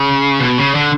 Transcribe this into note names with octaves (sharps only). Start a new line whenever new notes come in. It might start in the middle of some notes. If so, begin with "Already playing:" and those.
Already playing: C#3
B2
C#3
D3